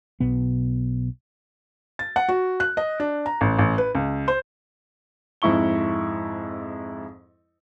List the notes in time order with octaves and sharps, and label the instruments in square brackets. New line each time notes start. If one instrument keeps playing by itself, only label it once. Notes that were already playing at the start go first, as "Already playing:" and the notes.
[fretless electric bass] B1 B2 B3
[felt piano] A6
F#5
F#4
F#6
D#5
D4
A#5
A1
A1
B4
C#2
C5
[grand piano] F2 G#2 E4 C#6 G7